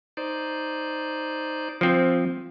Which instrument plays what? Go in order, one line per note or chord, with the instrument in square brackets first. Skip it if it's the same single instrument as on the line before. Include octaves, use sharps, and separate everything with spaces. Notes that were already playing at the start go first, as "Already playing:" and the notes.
[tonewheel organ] D#4 C5 D5
[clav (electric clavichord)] F3 C4